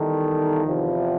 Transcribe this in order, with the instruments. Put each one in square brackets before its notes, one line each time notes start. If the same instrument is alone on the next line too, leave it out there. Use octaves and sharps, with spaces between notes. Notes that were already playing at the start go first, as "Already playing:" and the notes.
Already playing: [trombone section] D#3 [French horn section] E3 G3 B3 E4 A4
[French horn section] E2 C3 F3